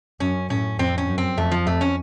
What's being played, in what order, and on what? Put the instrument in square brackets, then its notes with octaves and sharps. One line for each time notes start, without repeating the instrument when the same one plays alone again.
[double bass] F#2 [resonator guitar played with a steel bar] C#4
[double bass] A2 [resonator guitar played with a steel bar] C#4
[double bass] F2 [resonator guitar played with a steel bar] C4
[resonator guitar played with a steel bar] C#4
[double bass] F#2
[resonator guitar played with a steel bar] C4
[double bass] F2 [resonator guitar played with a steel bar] A3
[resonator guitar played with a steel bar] F3
[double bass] F2 [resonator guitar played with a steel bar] A3
[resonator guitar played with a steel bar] C#4